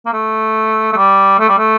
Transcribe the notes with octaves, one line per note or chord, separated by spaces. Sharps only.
A#3
A3
A3
G3
A3
G3
A3